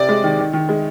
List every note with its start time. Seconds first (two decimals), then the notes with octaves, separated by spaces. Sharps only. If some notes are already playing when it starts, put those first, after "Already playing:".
Already playing: C3 D5
0.09 G#3
0.24 D#3
0.39 D#3
0.53 D#3
0.69 G#3